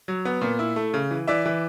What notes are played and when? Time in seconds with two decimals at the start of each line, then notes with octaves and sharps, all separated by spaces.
0.08 F#3
0.25 B3
0.41 A#2
0.59 E4
0.76 A3
0.94 C#3
1.11 E3
1.27 E3 D5 E5
1.46 E3